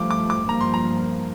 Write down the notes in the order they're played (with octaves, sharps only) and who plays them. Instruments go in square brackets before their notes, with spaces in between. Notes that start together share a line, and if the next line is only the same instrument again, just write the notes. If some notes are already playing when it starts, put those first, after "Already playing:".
Already playing: [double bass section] G2 F3 A3 [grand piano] D6
[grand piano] D6
D6
[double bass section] G2 F3 A#3 [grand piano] A#5
[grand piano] C6
A#5